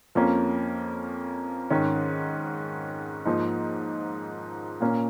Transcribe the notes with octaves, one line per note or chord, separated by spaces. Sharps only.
F2 F3 A#3 C#4
G#2 D#3 C#4
G#2 F3 A#3 D#4
A#2 A#3 C#4